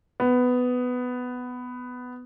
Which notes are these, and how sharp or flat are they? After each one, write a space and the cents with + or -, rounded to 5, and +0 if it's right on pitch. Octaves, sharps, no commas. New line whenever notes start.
B3 +10